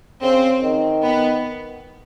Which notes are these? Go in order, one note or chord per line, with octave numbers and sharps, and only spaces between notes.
C#3 C4
D#3
B3